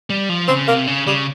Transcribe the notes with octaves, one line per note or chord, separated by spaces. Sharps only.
G3
F3
C#3 C4
C3 A#3
C#3
C#3 G3